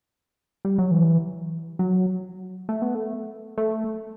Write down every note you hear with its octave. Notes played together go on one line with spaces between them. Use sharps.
G3
F#3
E3
F#3
A3
B3
A3
A3